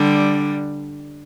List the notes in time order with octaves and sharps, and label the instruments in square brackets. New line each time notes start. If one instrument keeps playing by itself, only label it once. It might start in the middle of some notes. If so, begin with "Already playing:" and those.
Already playing: [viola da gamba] D3 G3